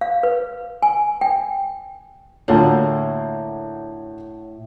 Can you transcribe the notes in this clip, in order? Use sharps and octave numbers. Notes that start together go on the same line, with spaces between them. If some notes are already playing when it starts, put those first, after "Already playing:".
F5
B4
G#5
G5
D2 A2 A#3 F4 C#5 F#5 A5